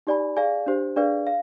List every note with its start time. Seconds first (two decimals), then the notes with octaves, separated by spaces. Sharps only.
0.07 D#4 G4 D5 G#5 B5
0.37 G#4 D5 F5 G#5
0.66 D4 G4 C5
0.96 D4 G#4 B4 D5 F5
1.27 F5